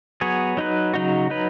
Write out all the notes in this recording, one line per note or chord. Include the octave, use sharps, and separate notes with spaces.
F#3 B3 G#4 C#5
F#3 D#4 B4
C#3 F#3 D#4 F#4
F#3 D#4 B4